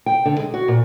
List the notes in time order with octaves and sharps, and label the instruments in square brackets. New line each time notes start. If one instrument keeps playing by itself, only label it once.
[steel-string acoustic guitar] G5
D3
G#3
F#4
A#2